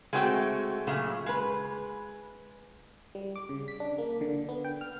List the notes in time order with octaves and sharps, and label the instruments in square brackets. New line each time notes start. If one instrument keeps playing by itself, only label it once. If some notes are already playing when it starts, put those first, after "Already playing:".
[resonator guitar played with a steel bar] G#3 A3 C4 F#4 C#5 G5
A#2 C#3 F#3 A3
G#3 B4
[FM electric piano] G3
D6
C#3
B6
D4
A#3
D3
B3
G5
F6